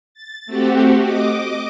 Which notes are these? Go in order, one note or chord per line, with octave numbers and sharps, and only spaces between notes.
A6
A3 C4 F#4 G4
D#5 D6